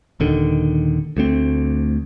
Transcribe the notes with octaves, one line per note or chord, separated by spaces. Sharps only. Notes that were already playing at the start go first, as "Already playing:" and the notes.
D#1 D#2 D3 D#3
D2 A3 C4